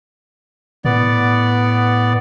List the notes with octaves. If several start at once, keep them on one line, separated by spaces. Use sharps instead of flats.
A2 B3 D5